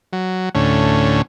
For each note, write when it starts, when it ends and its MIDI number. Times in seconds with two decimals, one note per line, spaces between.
0.13 0.49 54
0.55 1.22 38
0.55 1.22 45
0.55 1.22 61